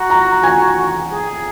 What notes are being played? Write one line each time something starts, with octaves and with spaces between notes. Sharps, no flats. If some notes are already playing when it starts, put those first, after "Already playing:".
Already playing: F#4 A#5
A#5
G#5
G#4